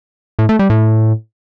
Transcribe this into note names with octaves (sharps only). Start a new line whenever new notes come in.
A2
A3
G3
A2